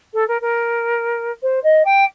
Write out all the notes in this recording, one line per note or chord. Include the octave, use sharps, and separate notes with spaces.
A4
A#4
A#4
C5
D#5
G5